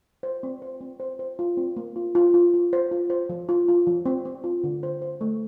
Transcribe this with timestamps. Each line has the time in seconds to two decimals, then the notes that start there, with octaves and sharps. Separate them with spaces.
0.23 C5
0.43 C4
0.62 C5
0.81 C4
1.00 C5
1.19 C5
1.39 F4
1.57 C4
1.77 A#3
1.96 F4
2.15 F4
2.34 F4
2.54 F4
2.73 C5
2.91 F4
3.10 C5
3.29 F3
3.49 F4
3.68 F4
3.87 F3
4.06 C4
4.25 C4
4.44 F4
4.64 D3
4.83 C5
5.02 C5
5.21 A3